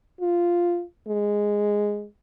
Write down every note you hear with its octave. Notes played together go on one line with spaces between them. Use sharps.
F4
G#3